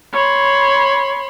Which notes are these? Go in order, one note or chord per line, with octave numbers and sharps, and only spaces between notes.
C#5 B5 C6